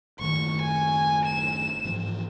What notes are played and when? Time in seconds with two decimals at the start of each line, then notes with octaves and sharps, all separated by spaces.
0.19 F#1 A2 D#3 C#6
0.62 G#5
1.26 E7
1.85 G#2 E3 F3